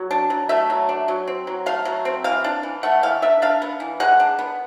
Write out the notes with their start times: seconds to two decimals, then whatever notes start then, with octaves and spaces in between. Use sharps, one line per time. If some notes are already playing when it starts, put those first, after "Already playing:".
Already playing: F#3
0.11 D4
0.30 F#3
0.49 A3 E5
0.70 F#3
0.89 D4
1.08 F#3
1.27 C4
1.47 F#3
1.66 A3 F5
1.85 F#3
2.05 C4
2.24 E3 F5
2.44 D4
2.63 E3
2.83 A3 F#5
3.03 E3 F5
3.22 D4 E5
3.42 D4 F5
3.62 B3
3.80 E3
4.00 G#3 F#5
4.20 D4
4.39 B3